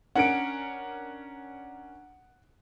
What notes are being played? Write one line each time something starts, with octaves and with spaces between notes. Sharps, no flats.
C#4 D4 A#4 F#5 D7